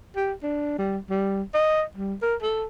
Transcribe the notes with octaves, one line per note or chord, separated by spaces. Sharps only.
G4
D4
G3
G3
D#5
G3
A#4
A4